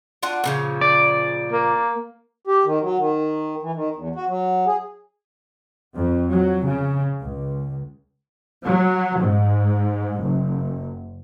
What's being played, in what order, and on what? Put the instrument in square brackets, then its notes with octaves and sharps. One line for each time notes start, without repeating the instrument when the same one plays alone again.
[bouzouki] D4 F4 F#4
A#2 C#3 F3
[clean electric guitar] D5
[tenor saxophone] A#3
[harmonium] G4
D#3
F#3
D#3
E3
D#3
E2
F#4
F#3
G#4
[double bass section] F2
F#3
C#3
C#2
F#3
G#2
F#1